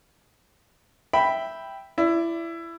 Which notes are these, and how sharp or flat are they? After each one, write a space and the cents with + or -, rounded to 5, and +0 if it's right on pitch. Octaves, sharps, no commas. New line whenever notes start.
E5 +0 G5 +0 B5 +0
E4 +20 D5 +0